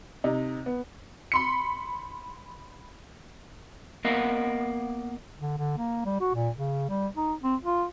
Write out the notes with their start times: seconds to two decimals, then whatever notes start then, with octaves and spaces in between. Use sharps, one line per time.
0.24 C3 D#4
0.66 B3
1.32 B5 C6 C#7
4.05 A#3 B3 A#4 D#5 F5 F#5
5.40 D3
5.58 D3
5.77 A#3
6.05 G3
6.20 F#4
6.34 A#2
6.56 C#3
6.89 G3
7.17 D#4
7.43 C4
7.62 F4